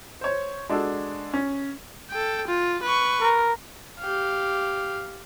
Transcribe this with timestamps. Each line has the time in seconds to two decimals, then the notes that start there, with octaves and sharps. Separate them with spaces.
0.21 C5 C#5
0.69 G#3 D4 F#4 A4
1.34 C#4
2.10 A4 G5
2.47 F4
2.82 B4 C#6
3.20 A#4
3.99 G4 F5